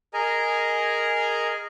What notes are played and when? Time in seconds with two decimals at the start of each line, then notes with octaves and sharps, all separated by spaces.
0.14 G#4 A#4 D#5 G#5 A#5